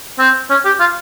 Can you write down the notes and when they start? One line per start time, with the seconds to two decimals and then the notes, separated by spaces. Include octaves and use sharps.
0.19 C4
0.50 C#4
0.65 G4
0.80 F4